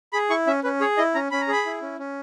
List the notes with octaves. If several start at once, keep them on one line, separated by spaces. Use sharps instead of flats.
G#4 B5
E4 C#6
C#4 E5
C#4 B4
G#4 C#5
E4 D#5
C#4 A#5
C#4 B5
A#5
G#4 B5
E4
C#4
C#4